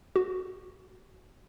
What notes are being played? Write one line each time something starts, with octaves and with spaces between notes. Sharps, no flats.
F#4